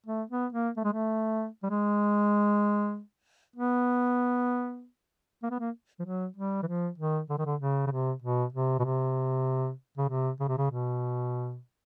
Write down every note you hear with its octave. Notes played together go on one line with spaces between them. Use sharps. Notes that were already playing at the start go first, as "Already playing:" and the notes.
A3
B3
A#3
A3
G#3
A3
G3
G#3
B3
A#3
B3
A#3
F3
F#3
G3
E3
F3
D#3
D3
D#3
D3
C#3
C#3
C3
B2
C3
B2
C3
C#3
C3
C#3
C3
C#3
B2